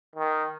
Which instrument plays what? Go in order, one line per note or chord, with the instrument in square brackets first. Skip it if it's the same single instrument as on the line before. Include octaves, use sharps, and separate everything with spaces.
[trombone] D#3